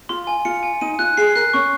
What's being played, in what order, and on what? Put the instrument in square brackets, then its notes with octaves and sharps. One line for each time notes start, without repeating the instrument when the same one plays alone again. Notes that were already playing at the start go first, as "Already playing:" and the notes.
[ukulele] F4 [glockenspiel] C6
[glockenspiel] G#5
[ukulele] F4 [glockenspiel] C#7
[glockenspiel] G#5
[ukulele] D#4 [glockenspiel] D#7
[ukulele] F4 [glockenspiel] F#6
[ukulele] G#4 [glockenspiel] C7
[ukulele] A#4 [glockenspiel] F#6
[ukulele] C#4 [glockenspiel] C#6